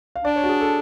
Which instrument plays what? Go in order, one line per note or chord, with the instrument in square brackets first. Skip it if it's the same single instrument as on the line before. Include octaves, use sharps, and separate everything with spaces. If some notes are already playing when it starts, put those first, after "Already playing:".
[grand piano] F5
[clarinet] D4 [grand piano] D5
[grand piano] C#5
F#4
G#4
A4